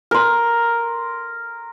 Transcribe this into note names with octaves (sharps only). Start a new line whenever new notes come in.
A#4 C6